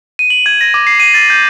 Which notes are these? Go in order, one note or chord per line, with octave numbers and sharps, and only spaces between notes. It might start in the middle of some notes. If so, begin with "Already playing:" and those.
D#7
F#7
G#6
A#6
D6
C7
D#7
A6
G6